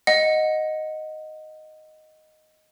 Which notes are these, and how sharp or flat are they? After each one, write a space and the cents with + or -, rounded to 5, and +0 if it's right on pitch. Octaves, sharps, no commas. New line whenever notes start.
D#5 +0 F#5 -10